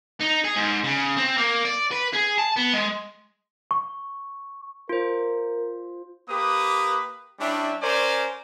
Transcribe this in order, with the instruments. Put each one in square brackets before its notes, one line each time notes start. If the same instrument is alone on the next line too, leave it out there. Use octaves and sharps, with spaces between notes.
[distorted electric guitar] D#4
G#4
G#2
C#3
C4
A#3
D5
B4
G#4
A5
B3
G#3
[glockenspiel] C#6
[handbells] F4 C5 [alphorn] A#4
[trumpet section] A#3 G4 B4 D#6
G3 C#4 D4 E4 E5
C#4 A#4 C5 D5 G#5